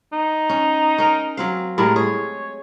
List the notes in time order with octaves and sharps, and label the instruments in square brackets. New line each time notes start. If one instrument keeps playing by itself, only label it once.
[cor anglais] D#4
[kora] C#4
C#4 A#4
F#3 C4 F5
[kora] A2 G3 G#3 [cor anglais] A#4
[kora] G#4 [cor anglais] C#5